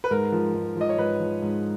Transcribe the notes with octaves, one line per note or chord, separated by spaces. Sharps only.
B4
G#2 A#4
F3
G#2
F3 D#5
C#5
G#2 B4
F3
G#2